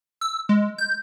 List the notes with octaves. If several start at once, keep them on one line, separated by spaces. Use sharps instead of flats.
E6
G#3
G6